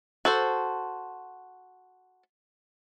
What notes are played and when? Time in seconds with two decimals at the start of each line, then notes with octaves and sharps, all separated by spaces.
0.25 F#4 A4 C5